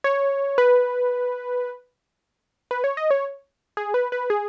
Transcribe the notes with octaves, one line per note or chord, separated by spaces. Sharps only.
C#5
B4
B4
C#5
D#5
C#5
G#4
B4
B4
G#4